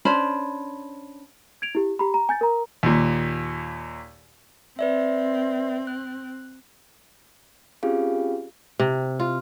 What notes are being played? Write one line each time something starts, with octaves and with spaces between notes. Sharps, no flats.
C#4 D4 C5 B5
G#6 D7 F7
E4 G4
G4 A#5 B5
A#5
G#5 G6 A6
A#4 A#5
D#2 A#2
C4 B4 D5 E5
F#6
C4 C#4 F4 G4 G#4 F5
C3
F4